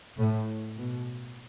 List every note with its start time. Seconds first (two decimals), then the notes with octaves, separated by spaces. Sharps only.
0.18 A2
0.77 B2